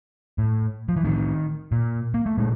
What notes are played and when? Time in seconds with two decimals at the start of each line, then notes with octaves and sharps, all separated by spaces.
0.38 A2
0.89 F3
0.97 E3
1.04 A2 D#3
1.72 A#2
2.14 A#3
2.26 A3
2.38 A#2 G#3